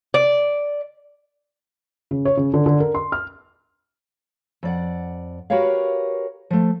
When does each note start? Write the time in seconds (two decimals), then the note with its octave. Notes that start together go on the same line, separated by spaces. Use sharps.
0.14 D5
2.11 C#3
2.25 C#5
2.37 C#3
2.54 D3
2.66 D3
2.80 A#4
2.94 C6
3.12 F6
4.63 F2 D5 F#5
5.50 F#4 G4 A#4 B4 C#5 F5
6.50 F3 A3